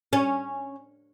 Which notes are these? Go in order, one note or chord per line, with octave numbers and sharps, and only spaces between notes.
C#4